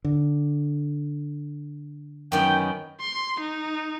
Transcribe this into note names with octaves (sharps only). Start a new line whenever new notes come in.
D3
F#2 D#3 B3 G5
C6
D#4